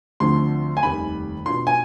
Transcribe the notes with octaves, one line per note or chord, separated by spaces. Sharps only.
D2 D3 F3 C4 C6
G#5
F1 D#2 D#3 G3 C4 B5
B2 B3 D4 F4 C6
G#5